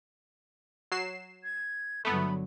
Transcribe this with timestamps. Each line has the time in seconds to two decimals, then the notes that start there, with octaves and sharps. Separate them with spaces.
0.92 F#3 C7 E7
1.44 G#6
2.05 G1 D3 F#3 A3 B3 B5